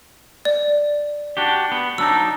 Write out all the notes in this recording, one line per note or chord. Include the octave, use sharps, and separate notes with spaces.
D5
D4 F#4 G4
B3
F#3 D4 D#4 E6